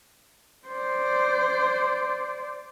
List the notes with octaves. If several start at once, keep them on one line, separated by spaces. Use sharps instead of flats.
C5 D5